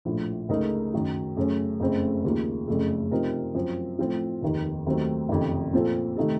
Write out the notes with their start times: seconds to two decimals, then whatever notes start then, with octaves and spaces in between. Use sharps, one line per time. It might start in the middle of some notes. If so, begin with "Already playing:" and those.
0.05 A#1 A2 F3
0.49 C#2 C#3 A3 D#4 A#4
0.94 F#2 D#3 F#3
1.37 F#2 C#3 A3 C#4
1.80 F#1 F2 C#3 A3 C4
2.24 D#2 C#3 F3 A#3
2.68 F#1 F2 C#3 A3
3.11 C3 F3 C4 D#4 A#4
3.54 F#2 F3 C4
3.99 A2 F3 C4 F4
4.42 F1 D#2 D#3
4.86 D#2 D#3 F#3 A3 C4
5.29 F#1 F2 C3 D#3
5.73 A#2 F3 C4 F4 A4
6.16 C3 D#3 A3 D#4 A4